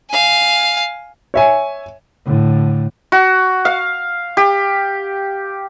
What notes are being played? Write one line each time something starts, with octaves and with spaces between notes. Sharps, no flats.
F5 G#5
C#5 E5 G#5
A2 D3
F#4
F5
G4